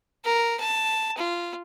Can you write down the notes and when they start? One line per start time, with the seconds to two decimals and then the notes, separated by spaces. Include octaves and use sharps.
0.25 A#4
0.60 A5
1.17 F4